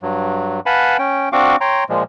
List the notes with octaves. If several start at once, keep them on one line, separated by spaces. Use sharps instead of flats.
G2 F#3
B4 F5 F#5 G#5 A5 B5
C#4 G5
C4 D4 F#4 F5 C#6 D6
C#5 G5 A#5 C6
A#2 F3 G#3